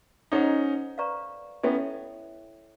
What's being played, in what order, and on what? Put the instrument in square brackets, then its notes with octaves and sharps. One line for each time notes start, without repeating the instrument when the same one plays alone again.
[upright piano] C#4 D#4 [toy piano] A4 C5 D#5 F#5 A#5
[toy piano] B4 D5 F5 A#5 C#6
[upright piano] B3 C#4 [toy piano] E4 A4 C#5 E5 G5